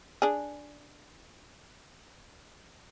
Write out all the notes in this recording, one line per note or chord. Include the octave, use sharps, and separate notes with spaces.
D4 G#4